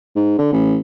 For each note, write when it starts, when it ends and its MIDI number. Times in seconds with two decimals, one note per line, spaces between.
0.16 0.34 44
0.39 0.50 50
0.53 0.76 33